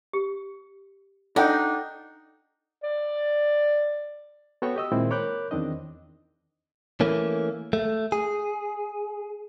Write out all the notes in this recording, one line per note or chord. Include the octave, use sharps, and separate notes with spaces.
G4
D4 D#4 F4 A4 F#5 G5
D5
B3 F#4 A4 C#5 G5 C#6
G4 D#5 E6
A#2 D#3 G#3 C4 E4
A#4 C#5 B5 D6 F#6 G6
E2 D#3 C4 D4 D#5
E3 A3 A#3 C#4
A3
G#4